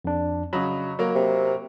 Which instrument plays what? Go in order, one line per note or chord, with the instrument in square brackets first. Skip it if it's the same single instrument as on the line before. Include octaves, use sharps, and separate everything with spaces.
[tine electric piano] F2 D4
[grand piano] C#3 F#3 [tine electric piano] D#5 B5
[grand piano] F#3 A#3
[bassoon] C3